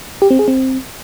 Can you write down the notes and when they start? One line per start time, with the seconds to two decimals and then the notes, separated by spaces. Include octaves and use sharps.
0.22 G4
0.30 C4
0.39 G#4
0.48 C4